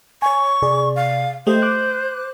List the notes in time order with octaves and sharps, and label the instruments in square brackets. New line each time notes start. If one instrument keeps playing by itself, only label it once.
[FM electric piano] C#5 G#5 [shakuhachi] C#6
[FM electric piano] C3 G#4 D5
[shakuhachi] F5
[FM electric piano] A3 G4 D#5 [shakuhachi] C5
[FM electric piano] D6 F#6